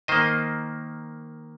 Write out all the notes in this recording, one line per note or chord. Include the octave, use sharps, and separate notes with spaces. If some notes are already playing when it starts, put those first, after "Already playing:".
D#3 A#3 C5 D#5